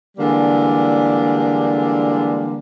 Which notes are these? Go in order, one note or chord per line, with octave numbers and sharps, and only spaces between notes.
D3 E3 G3 G#3 A#3 D4